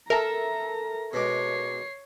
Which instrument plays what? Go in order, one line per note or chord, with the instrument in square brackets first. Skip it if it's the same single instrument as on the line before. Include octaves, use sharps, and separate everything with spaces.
[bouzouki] A4 E5 [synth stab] A#4 [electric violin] A#5
[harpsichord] B2 G#3 D6 [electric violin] C#5 C7